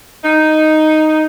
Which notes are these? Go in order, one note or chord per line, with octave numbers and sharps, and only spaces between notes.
D#4